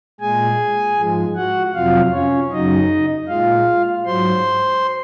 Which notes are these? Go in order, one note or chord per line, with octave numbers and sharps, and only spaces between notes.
A#2 G#3 G#4 G#5
G#2 F3 G#3
F#4 F#5
F2 C3 F#3 F4 F5
C#4 C#5
F#2 C#3 F#3 D#4 D#5
A#2 G#3 F4 F5
G#2 F#3 C5 C6